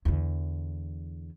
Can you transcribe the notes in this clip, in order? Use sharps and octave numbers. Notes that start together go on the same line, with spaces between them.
E2 D3